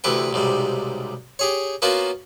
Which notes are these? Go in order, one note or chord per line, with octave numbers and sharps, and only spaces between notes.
D2 C3 E3 B4 G5
B1 G#2 C3 G3
G4 G#4 C#5
A#3 B3 C#4 F4 F#4 A#4